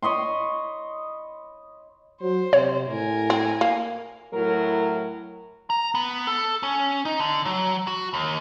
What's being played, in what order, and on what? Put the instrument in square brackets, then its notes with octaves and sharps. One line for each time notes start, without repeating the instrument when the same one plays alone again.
[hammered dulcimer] C#5 D#5 B5 C6
[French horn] F#3 [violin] C5
[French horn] C3 [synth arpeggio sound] C#5
[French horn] A2 [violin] A#4 G#5
[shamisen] C4
A#3
[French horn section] A2 F#3 A#4
[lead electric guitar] A#5
B3
A4
C#4
D#4
D3
F#3
F#4
D#2